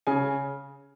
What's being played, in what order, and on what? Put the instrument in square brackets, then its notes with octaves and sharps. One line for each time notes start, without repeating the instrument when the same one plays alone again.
[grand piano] C#3 G#5